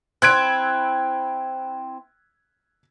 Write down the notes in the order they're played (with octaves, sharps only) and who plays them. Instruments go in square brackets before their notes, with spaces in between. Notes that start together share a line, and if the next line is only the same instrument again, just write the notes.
[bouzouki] C4 E4 [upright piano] F#6 G#6 D7